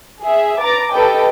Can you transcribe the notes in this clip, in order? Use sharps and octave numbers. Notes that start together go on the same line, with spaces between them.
G#4 E5
B4 A#5 D6 A6
G4 A4 B4 D#5 G5